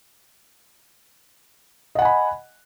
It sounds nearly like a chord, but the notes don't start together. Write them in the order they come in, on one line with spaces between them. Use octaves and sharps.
D#5 F#5 G#5 B5